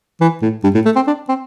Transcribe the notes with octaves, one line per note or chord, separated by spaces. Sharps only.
E3
A2
G2
A2
A3
C4
D4
C4